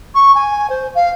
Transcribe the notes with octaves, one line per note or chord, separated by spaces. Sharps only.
C#6
G#5
C5
F5